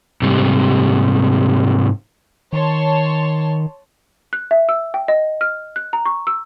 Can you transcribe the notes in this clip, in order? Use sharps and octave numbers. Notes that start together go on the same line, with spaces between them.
G#2 C3 G3
D#3 C#5 A5 C6
F#6
E5
E6
G5
D#5
F6
F#6
A#5
C#6
E6